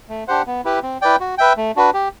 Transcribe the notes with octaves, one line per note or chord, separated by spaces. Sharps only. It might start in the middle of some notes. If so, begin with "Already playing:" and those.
A3
D4 G4 C5 F#5
B3
E4 G4 B4
C4
E4 B4 D5 G5
F#4
B4 E5 G5
A3
D4 F#4 B4
G4